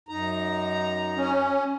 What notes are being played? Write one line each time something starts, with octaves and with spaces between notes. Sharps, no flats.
F#2 D#4 A#5
C#4